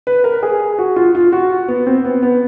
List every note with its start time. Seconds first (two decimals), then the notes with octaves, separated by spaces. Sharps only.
0.07 B4
0.24 A#4
0.43 G#4
0.78 F#4
0.96 F4
1.15 F4
1.32 F#4
1.68 B3
1.87 C4
2.05 B3
2.23 B3